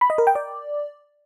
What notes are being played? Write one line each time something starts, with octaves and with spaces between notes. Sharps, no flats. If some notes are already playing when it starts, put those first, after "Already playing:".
B5
D#5
A#4
G5
D5